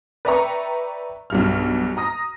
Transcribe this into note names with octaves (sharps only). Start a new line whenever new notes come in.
B4 D5 E5 G5 A#5 C#6
B1 G2 F6
A#5 D#6 A#6